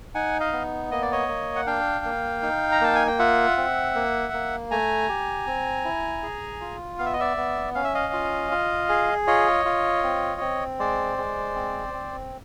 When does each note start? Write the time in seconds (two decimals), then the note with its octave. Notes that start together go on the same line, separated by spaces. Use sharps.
0.14 D#4 F#5 G#5
0.40 D#5 F5
0.53 B3
0.91 A#3 D#5
1.02 D5
1.12 C#5 D#5
1.28 A#3
1.56 F#5
1.66 D4 F5 G5
2.05 A#3
2.43 D#4
2.72 A#5
2.81 A#3 A5
2.95 G#5
3.07 G5
3.19 F4 E5 F#5
3.57 C4
3.95 A#3
4.33 A#3
4.71 A3 G#5 A#5
5.09 G4
5.47 C4
5.85 E4
6.23 G#4
6.61 F4
6.98 B3 F5
7.06 E5
7.13 D#5
7.20 D5 E5
7.37 B3
7.75 C#4 F5
7.84 E5
7.94 D#5 F5
8.13 F4
8.51 F4
8.89 G#4
9.27 F4 C#5 D#5
9.65 F4
10.04 C4
10.41 C4
10.79 G#3 C5 D5
11.18 G#3
11.55 C4
11.93 C4